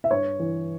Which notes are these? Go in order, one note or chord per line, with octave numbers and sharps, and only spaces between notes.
E5
G2 C#5
E3